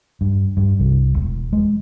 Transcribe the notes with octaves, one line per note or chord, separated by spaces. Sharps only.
G2
G2
C2
E1
G#3